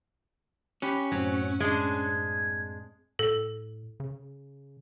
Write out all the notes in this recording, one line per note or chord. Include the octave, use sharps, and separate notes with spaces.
C#4 G4 B5 F#6
F#2 A2 F#3 C4
G#3 D4 G#6
A2 A4
C#3